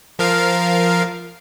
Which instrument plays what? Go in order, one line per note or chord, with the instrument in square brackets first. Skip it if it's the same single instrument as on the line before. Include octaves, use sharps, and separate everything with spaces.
[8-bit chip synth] F3 A#4 F5